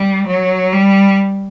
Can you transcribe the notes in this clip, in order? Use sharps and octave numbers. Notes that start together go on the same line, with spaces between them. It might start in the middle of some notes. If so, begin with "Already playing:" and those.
Already playing: G3
F#3
G3